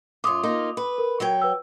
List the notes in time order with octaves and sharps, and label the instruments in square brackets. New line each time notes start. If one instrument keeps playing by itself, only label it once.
[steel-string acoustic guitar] F#2 F4 [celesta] D6 D#6
[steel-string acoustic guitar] A#3 D#4 F4
B4
[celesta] A#4
[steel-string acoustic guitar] F#3 C#5 G5
[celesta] B4 E6